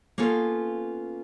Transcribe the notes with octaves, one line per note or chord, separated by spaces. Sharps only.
A#3 B3 C#4 F4 A4